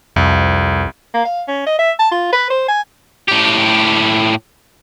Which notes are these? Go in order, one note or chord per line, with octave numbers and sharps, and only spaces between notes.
C2 F2
A#3
F5
C#4
D#5
E5
A5
F4
B4
C5
G#5
A2 G4